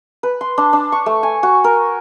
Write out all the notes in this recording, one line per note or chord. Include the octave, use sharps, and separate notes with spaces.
B4
C6
D4
D4
C#6
A3
G#5
F#4
A#4